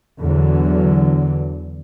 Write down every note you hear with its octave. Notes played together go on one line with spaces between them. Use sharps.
E2 D3 E3 F#3